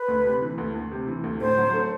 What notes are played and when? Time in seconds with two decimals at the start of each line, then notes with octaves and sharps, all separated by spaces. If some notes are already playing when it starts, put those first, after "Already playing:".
Already playing: B4
0.08 D2
0.25 C3
0.41 E3
0.58 D2
0.75 D2
0.91 C3
1.07 E3
1.24 D2
1.41 A2 C5
1.57 F#3
1.73 A3